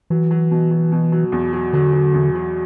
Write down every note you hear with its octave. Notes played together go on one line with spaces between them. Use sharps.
E3 F#3
F#3
B2
F#3
B2
F#3
E2
F#3
D3 F#3
F#3
E2
F#3